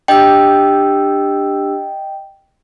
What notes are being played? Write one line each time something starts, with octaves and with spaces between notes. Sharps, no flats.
D4 G4 D#5 G5 E6